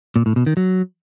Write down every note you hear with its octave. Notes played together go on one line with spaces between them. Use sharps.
A#2
A2
B2
D#3
F#3